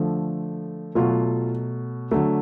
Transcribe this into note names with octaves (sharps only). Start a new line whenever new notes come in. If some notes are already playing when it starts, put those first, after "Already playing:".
Already playing: D3 F3 A3
B2 F#3 A3 F4
D3 F#3 A3